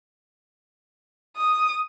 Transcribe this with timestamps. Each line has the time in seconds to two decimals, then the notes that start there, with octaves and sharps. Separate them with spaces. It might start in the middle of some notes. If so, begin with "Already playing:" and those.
1.37 D#6